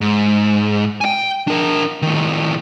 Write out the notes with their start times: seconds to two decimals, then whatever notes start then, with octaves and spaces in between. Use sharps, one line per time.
0.01 G#2
1.01 G5 G#5
1.48 D4 A#4
2.02 A2 D#3